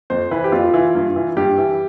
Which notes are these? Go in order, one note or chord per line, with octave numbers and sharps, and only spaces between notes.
F2 C5
E3 B4
G4
F2 F4
E3
G2
E3
G2 G4
E3